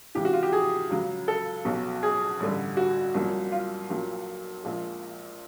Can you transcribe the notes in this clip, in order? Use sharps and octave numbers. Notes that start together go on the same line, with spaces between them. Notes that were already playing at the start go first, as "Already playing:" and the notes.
C#2 C3 E3 G4
F#4
F4
G4
G#4
C#2 C#3 F#3
A4
B1 B2 F#3
G#4
A1 G2 D3 G3
F#4
C2 A#2 F#3
F4
B1 A#2 F#3
A#1 A#2 F3 G#3